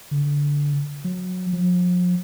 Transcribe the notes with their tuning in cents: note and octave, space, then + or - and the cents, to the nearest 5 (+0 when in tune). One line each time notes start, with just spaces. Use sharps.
D3 -20
F#3 -20
F3 +40